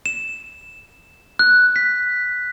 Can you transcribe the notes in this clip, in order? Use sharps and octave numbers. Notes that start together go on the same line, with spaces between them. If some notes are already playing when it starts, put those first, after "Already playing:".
E7
F#6
B6